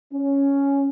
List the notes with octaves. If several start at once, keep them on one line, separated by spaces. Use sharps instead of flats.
C#4